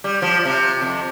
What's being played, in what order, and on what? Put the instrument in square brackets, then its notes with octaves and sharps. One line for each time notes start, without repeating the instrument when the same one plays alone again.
[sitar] G3
F3
C3
F2